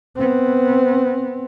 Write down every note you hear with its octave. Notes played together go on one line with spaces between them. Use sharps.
B3 C4